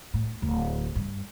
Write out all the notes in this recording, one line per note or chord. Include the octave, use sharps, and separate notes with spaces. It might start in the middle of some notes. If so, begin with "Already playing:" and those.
A2
D1
G2